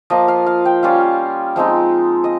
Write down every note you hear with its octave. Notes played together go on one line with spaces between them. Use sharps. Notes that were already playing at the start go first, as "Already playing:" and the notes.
F3 A#3 F4 D#5
F5
F5
G5
G3 C#4 F4 F5
F3 G#3 C4 D#4
D#5